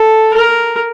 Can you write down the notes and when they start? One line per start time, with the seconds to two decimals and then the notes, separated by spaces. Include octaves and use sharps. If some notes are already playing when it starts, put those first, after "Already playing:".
Already playing: A4
0.34 A#4